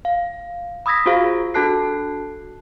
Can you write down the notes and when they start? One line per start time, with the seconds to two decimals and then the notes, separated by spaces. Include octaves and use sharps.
0.05 F5
0.86 B5 D#6 E6 G#6 A#6 B6
1.06 F4 F#4 G#4 C5 F5
1.54 D4 F#4 A4 A5 F#6 C7